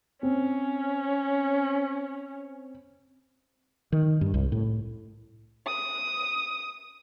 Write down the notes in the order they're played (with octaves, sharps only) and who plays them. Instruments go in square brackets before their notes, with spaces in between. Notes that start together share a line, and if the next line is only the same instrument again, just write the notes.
[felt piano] C4 [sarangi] C#4
[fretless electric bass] D#3
G2
C2
A2
[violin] D#6